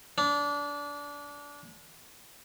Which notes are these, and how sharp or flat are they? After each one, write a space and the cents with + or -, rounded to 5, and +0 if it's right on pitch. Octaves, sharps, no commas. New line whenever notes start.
D4 -25